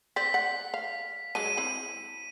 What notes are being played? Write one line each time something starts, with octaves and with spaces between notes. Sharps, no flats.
C4 D5 B6
F#5
F5
F#3 G#3 D4 D#7
C4 E4 B5